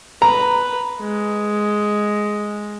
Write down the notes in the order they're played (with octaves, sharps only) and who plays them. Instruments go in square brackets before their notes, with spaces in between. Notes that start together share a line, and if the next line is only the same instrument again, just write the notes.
[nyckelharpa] B4 [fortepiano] A#5
[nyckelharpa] G#3